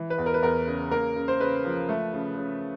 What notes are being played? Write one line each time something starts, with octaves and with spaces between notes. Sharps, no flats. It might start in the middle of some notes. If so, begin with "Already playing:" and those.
Already playing: E3
B4
E2
A#4
B4
E2 A#4
C#3
A#3 A#4
C#3
C5
C#3 B4
F3
A3
C#3
C#3